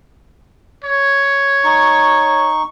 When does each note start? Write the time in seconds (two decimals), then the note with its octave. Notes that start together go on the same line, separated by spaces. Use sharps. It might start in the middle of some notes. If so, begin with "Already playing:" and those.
0.84 C#5
1.64 D#4 C#6